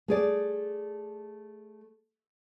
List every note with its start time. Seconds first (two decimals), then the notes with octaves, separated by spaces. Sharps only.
0.08 A3 G#4 D5